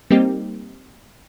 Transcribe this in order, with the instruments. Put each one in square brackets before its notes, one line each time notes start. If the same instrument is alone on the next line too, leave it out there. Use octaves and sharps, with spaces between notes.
[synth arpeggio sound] G3 A#3 C4 D#4 G4